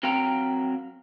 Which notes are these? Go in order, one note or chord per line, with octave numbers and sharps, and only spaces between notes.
F#3 C4 A#4 F5 G5 A#5